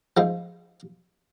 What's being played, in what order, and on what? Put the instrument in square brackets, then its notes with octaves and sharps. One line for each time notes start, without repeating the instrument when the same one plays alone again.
[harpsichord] G#2 F3 A3